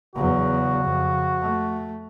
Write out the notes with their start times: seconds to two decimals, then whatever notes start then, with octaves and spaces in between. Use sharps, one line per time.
0.16 E2 C#3 F#3 F#4
0.84 F2
1.42 A3